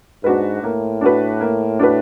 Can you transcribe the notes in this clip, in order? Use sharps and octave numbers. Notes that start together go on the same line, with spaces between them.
G#2 D4 F#4 B4
A2 A#3
D4 F#4 B4
A#3
D4 F#4 B4